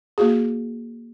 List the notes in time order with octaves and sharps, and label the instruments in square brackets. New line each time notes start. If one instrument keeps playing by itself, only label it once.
[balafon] A#3 F#4 G#4